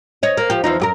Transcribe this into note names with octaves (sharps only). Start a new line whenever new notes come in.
C#5 D#5
A#3
F3 G4
E2 F3 D#4
F#2 G4 A#4